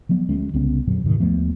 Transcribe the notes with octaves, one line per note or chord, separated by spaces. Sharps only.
F3 F#3 B3
D2 G#3 C#4
C2 C#3 B3 C#4
F2 A#2 D3 F#3
D2 G#2 C3 D#3
D#2 F3 A3 B3